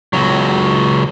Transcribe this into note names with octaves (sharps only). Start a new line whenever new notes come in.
C#2 F#3